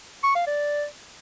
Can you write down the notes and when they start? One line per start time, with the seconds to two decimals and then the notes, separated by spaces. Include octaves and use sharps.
0.24 C#6
0.36 F5
0.47 D5